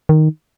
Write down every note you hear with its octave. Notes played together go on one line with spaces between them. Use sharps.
D#3